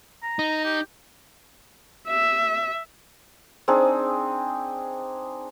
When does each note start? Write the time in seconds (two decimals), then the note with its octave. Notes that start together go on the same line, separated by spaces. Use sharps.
0.23 A#5
0.39 D#4
0.65 G4
2.09 E5
3.68 C4 D4 D#4 G#4